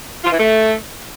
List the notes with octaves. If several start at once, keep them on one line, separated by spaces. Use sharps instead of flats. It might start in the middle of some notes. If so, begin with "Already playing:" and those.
F4
E3
A3